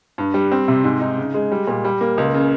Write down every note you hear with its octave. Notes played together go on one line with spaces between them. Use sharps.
G2
G3
C4
C3
G#2
D#4
C#3
G#3
G3
A#2
G3
A#3
C#2
C#3